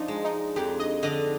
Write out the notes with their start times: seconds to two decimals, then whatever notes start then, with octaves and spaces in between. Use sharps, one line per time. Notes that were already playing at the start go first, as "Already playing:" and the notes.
Already playing: F3 D4 D#4
0.08 G#3
0.24 D#4
0.56 F2 G4
0.79 D#5
1.03 D3 D#5